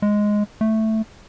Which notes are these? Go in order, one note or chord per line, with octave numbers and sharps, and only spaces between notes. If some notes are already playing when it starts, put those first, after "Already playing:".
G#3
A3